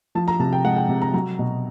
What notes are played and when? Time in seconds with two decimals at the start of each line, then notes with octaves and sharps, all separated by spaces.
0.15 F3 A5
0.28 A#5
0.39 C3 A5
0.53 G5
0.64 G#3 F#5
0.76 G5
0.89 C3
1.02 A#5
1.14 F#3 A#5
1.39 B2